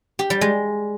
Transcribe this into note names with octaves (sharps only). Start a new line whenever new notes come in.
G4
G3
G#3